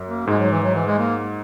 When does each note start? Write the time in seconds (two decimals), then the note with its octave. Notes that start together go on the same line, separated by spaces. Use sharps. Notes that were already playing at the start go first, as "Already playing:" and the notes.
Already playing: F#2
0.08 A#3
0.27 G#2 G#3
0.39 F#3
0.51 E3
0.63 F#3
0.75 E3
0.87 G#3
0.99 A#3